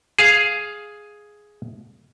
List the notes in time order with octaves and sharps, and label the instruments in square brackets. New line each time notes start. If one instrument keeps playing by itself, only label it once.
[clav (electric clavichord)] G#4 F5